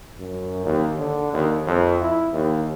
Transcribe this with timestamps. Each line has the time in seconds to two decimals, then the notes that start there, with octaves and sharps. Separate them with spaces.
0.19 F#2
0.65 D#2
0.98 D3
1.33 D#2
1.67 F2
2.01 E4
2.33 D#2